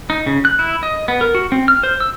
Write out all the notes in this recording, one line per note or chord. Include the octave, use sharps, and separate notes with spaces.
D#4
C#3
F#6
E4
D#5
B3
A#4
F#4
C4
F6
C5
E6